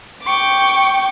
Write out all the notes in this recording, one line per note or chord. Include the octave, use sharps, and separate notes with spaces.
G5 C#6 D6